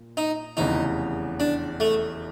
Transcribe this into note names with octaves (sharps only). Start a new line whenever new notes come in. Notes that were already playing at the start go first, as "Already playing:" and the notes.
Already playing: A#2
D#4
F1 E2 C#3 E3 D#4
D4
A3